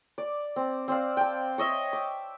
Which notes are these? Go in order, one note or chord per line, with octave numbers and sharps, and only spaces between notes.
D5
C4
C4 D5 F5
G5 A5
C#5 D#5 E5
D6